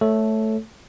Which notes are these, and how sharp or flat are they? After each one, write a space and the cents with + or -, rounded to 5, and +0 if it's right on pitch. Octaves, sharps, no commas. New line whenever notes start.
A3 -5 A4 +0 C#5 +0